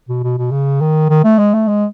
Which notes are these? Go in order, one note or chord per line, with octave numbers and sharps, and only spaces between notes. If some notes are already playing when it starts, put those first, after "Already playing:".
B2
B2
B2
C#3
D#3
D#3
A3
G#3
A3
G#3